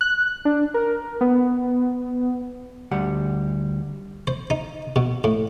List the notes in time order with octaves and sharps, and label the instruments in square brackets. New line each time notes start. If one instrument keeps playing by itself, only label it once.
[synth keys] F#6
D4
A#4
B3
[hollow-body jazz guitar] D2 G3 F#5
[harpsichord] C5
D#4
B2
A2